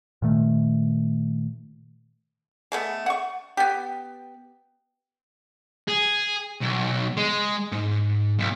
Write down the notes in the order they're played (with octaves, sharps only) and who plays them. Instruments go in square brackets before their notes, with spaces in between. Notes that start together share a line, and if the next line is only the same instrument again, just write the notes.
[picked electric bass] A#2 D#3 A3
[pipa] G#3 A3 B3
F#5 C#6
B3 G4
[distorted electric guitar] G#4
B1
G#3
G#2
B1